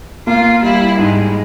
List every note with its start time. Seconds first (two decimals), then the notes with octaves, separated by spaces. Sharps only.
0.27 A#3 F4
0.62 G3 E4
0.98 G#2 G#3